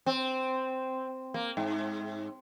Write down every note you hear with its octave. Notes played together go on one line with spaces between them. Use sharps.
C4
A#3
G#2